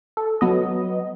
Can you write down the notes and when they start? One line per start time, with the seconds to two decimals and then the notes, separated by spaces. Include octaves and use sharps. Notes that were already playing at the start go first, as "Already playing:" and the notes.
0.17 A4
0.41 F#3 B3 D#5